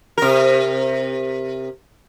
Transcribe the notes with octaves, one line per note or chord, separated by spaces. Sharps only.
C3 A#4